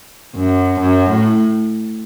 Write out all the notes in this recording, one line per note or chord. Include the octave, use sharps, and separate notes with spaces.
F#2
F#2
A2